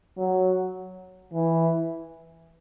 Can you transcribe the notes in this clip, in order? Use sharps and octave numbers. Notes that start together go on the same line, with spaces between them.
F#3
E3